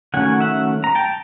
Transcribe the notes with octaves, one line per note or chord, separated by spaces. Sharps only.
D#3 F#3 A3 C#4 F#5 G#5
E5 F#5
A#5
G5 A5